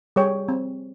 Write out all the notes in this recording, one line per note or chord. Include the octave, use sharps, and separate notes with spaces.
G3 G#4 C#5 G5
C4